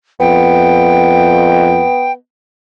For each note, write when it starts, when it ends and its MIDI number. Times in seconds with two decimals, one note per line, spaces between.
0.20 1.86 41
0.20 2.14 59
0.20 2.12 79